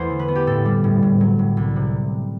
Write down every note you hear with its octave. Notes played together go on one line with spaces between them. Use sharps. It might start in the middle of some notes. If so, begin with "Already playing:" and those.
Already playing: E2 A3 C5 F#5
D3
B4
B3
G4
A2 A4
G3
A2
A2
F#3
A2
C2
C3